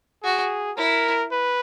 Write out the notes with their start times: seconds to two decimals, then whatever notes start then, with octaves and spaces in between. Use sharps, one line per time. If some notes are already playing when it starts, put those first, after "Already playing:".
0.23 F#4 G#4
0.77 E4 A#4
1.32 B4